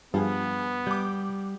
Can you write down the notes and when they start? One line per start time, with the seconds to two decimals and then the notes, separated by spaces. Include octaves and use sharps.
0.14 G2 F3 B3 G#4
0.87 G3 D6 G6